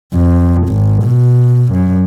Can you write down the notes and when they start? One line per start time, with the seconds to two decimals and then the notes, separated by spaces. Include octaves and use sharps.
0.14 F2
0.68 G#1
1.04 B2
1.73 F#2